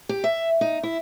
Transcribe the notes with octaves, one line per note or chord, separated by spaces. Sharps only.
G4
E5
D#4
E4